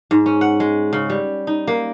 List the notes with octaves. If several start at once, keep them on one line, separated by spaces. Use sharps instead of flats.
G#2
C#4
F#5
G#3
C#3
G3
D#4
A#3